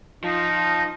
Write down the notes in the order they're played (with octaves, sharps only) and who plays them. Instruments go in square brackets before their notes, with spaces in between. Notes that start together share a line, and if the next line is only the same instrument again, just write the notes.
[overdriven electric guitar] F3 [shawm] D#4